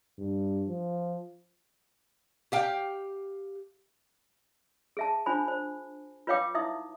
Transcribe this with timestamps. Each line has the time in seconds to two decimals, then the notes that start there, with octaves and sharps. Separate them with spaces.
0.18 G2
0.68 F3
2.52 G4 F5 G5
4.97 G#4 E5 A5
5.26 D4 F4 C5 G#5 B5
5.48 C5
6.27 F4 B4 C#5 F5 G5 D6
6.54 D#4 E4 E5 D#6